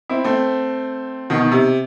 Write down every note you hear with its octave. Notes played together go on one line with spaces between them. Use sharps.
C4 E4
A3 C4
B2 D#3
D#3
C3